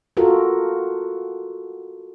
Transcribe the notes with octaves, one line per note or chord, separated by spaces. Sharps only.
F4 F#4 A4 A#4